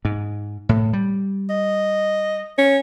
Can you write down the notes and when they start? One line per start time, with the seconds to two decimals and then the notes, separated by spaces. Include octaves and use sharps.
0.05 G#2
0.69 A2
0.93 G3
1.50 D#5
2.58 C#4